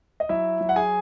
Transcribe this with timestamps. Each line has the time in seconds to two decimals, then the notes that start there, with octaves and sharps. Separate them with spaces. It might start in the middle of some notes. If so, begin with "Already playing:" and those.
0.20 D#5
0.29 F#3 E4 E5
0.61 F#3
0.69 F#5
0.76 G#4 G#5